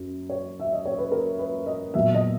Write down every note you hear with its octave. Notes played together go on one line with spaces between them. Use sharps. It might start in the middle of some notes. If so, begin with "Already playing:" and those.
Already playing: F#2
C#5
E5
D#5
C#5
B4
A#4
B4
D#5
A#2 F#3 B3 E5
D#5